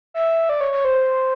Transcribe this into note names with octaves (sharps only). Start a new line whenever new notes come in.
E5
D5
C#5
C#5
C5